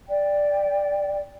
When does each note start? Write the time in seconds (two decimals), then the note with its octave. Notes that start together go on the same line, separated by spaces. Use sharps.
0.08 D5 G5